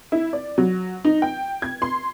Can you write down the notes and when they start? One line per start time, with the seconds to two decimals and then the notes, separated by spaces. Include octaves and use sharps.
0.12 E4
0.33 D5
0.58 F#3
1.05 D#4
1.22 G5
1.62 G#6
1.82 C6